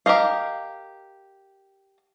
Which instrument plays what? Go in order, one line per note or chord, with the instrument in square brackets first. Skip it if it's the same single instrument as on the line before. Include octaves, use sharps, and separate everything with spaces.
[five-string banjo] G4 A#4 D#5 F5